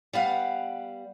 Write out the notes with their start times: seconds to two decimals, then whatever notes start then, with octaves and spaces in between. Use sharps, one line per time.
0.13 G3 B3 F5 F#5